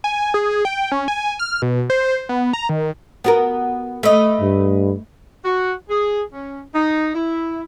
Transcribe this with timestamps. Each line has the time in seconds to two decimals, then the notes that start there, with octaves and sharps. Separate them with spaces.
0.04 G#5
0.34 G#4
0.65 G5
0.92 C#4
1.08 G#5
1.39 F6
1.62 B2
1.90 C5
2.29 B3
2.53 A#5
2.69 D#3
3.24 B3 F#4 A#4
4.03 A3 B4 D#5
4.41 G2
5.45 F#4
5.89 G#4
6.31 C#4
6.74 D#4
7.14 E4